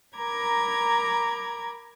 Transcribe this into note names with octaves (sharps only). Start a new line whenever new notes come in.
A#4 A#5 B5 D6 G#6